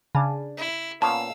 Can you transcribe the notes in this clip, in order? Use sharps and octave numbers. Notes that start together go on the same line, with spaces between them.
C#3 D4 G#5
E4
A#2 B3 C#4 F5 A5 E6